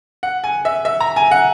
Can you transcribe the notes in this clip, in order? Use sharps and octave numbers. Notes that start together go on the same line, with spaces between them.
F#5
G#5
E5
E5
A#5
G#5
F#5